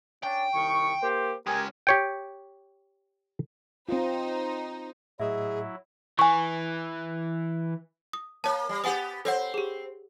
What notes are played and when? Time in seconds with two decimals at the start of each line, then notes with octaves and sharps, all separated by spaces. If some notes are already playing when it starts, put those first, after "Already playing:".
0.23 C#4 D4 G5
0.54 C2 D#3 C#6
1.02 A#3 G4 C5
1.47 G#3 C#4 G4 A#4 G#5
1.87 G4 C#5 G5
3.89 C4 D#4 F4 C5
5.20 A2 F#3 E4 G#4 D#5 E5 E6
6.19 E3 G#5 C#6
8.13 D#6
8.44 A#3 C#5 A5
8.69 G3
8.84 B3 G4 F#5 G#5 D#6
9.25 C4 A4 C5 C#5 F#5
9.54 G4 G#4